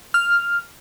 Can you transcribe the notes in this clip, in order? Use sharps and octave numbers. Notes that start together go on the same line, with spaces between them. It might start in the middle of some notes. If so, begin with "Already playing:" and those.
F6